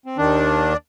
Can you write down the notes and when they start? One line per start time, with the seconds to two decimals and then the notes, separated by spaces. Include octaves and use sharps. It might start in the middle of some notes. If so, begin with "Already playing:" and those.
0.06 C4
0.18 D#2 D#3 D4